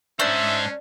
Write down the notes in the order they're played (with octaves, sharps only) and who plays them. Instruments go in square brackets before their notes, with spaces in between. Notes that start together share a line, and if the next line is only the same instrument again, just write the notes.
[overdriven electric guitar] G#2 C5 [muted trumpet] C#4 [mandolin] D4 [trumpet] E5